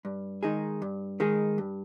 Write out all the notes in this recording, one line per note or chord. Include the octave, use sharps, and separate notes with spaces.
G2
D#3 G#3 D#4 G#4
G2
D#3 G#3 D#4 G#4
G2